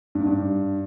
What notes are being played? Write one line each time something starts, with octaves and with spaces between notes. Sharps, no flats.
G2
G#2
G2